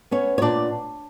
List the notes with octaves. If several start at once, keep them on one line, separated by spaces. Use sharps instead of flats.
B3 C#4 C#5
C#5
A#2 D4 D5